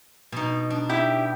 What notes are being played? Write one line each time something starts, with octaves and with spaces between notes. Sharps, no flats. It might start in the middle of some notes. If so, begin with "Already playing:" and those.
B2 D#4
D4
E4 G4 G5